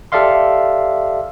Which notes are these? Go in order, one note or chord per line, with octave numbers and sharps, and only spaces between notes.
G4 A4 D5 E5 F5 C6